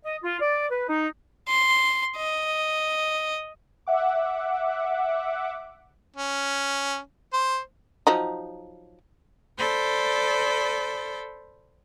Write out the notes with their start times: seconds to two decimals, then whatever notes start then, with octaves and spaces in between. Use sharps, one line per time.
0.05 D#5
0.23 F4
0.40 D5
0.71 B4
0.87 D#4
1.48 C6
2.17 D#5
3.87 E5 F#5 D6
6.16 C#4
7.33 C5
8.07 F3 F#3 D#4
9.58 A4 C5 D5 B5